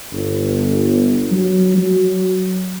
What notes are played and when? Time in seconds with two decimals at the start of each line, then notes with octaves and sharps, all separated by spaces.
0.13 G1
1.32 F#3
1.78 F#3